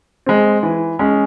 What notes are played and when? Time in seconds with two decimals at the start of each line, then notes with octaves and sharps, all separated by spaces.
0.26 G#3 C4
0.63 E3
0.99 G#3 C#4